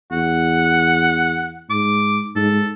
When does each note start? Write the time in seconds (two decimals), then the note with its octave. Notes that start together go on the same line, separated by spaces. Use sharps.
0.12 E2 F#5
1.70 G#2 D6
2.36 G#2 A4